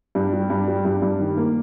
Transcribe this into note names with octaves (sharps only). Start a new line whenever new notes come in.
G2
G3
G2
G3
G2
G2
D#3
A#3